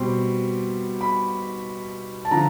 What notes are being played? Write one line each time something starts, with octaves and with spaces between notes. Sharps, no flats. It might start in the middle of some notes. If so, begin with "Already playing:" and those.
Already playing: B2 G3 C4 C6
B5
A5
D3 F3 A#5